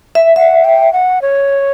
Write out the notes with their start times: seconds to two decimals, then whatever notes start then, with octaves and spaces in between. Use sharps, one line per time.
0.15 E5
0.36 E5 F#5
0.65 G5
0.93 F#5
1.22 C#5